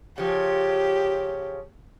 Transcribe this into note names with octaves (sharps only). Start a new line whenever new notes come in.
C#3 F3 G4